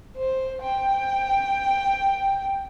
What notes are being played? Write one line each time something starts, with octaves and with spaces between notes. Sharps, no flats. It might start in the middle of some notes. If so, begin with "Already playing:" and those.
C5
G5